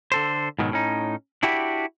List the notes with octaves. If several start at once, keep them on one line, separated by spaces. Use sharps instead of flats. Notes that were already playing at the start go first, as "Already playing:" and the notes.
D3 A4 C5
G#2 B2 D#3 F#3
A2 C#4 D#4
D4 E4 F#4 G4